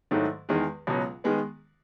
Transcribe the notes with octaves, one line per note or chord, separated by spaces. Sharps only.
G#2 D#3 F#3 A3 E4
E2 D#3 G#3
C#2 B2 F#3
D#3 G#3 B3